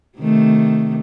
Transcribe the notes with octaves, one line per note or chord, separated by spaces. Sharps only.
C3 D#3 A3